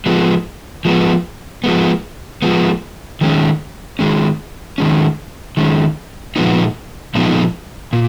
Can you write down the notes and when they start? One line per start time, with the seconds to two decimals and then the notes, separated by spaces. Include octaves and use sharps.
0.06 F3 G#3 B3
0.85 F3 G#3 B3
1.64 F3 G#3 B3
2.42 F3 G#3 B3
3.21 D#3 G#3 C#4
3.99 D#3 G#3 C#4
4.78 D#3 G#3 C#4
5.57 D#3 G#3 C#4
6.36 A#2 F3 G#3 B3 D#4
7.15 A#2 F3 G#3 B3 D#4
7.93 A#2